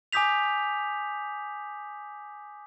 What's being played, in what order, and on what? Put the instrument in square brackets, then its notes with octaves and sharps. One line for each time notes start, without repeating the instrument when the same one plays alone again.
[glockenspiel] G#5 D6 D#6 G6 B6 F7